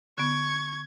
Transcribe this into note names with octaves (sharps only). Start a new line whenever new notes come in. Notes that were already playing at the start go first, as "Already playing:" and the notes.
D3 B3 C#6 G#6